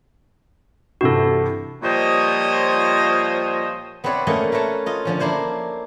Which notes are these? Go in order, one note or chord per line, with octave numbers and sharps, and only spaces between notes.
G2 C3 E3 F#4 A4
A#2 F3 G3 C5 C#5 D#5
B3 C4 E4 B4 C#5 D5
A3 A#3 C#4 A#4 C#5 D#5
A3 A#4 B4 C#5 A5
F4 D#5
D3 F3 C#4
A#3 D4 E4 C5 C#5